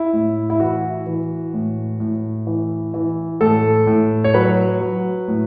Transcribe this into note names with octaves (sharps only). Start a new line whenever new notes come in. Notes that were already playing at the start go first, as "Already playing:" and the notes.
Already playing: E4
A2
E4
E3 F#4
E3
A2
A2
E3
E3
A2 A4
A2
C#5
F#3 B4
F#3
A2